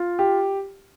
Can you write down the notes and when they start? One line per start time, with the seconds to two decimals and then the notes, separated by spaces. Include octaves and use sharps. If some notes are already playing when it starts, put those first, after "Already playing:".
Already playing: F4
0.19 G4